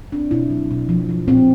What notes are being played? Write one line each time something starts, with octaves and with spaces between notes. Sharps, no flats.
C4 D4
B2 E4
F#3
B2
F3
F3
A#2 C4